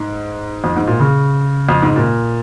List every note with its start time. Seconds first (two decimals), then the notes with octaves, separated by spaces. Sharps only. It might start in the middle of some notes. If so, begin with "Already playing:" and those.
Already playing: G#2
0.64 F2
0.76 G#2
0.87 A#2
1.00 C#3
1.69 F2
1.82 G#2
1.96 A#2